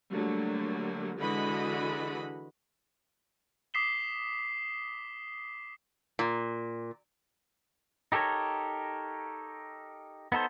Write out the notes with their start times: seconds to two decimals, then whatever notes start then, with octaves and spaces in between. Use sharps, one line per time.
0.12 D3 F#3 G3 A3 A#3
1.19 D3 E3 G#3 F#4 D#5 B5
3.74 D6 D#6 B6 C7 E7 G7
6.19 A#2
8.12 D#4 G4 A4 A#4 C#5
10.32 B3 D#4 A4 C5